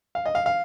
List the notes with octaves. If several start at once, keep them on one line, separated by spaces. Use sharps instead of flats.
F5
D#5
F5
F5